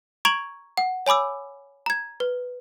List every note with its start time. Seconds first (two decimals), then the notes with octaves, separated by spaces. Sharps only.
0.25 A#5 C#6 G#6 D7 F7 F#7
0.77 F#5
1.06 C#5 G#5 B5 D6 E6
1.86 A#5 G#6
2.20 B4